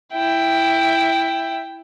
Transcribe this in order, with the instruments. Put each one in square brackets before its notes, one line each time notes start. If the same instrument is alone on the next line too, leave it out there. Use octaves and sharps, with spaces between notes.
[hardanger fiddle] E4 G5